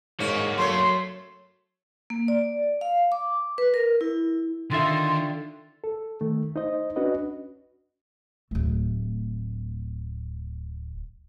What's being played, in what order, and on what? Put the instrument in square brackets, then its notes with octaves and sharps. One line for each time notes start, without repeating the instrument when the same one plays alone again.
[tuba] G#2 [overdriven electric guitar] A#3 F#4 [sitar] C#4
[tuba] F#3 [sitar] A3 C#5 [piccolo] C6
[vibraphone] A#3
D5
F5
D6
B4
A#4
E4
[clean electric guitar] D3 F4 E5 [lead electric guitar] D#3 [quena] C6
[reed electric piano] A4
D#3 A3
D#4 C5 D#5
C#4 D4 F#4 B4 D#5
[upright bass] D1 A3